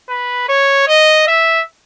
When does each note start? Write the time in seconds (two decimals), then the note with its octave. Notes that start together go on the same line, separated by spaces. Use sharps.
0.09 B4
0.49 C#5
0.88 D#5
1.27 E5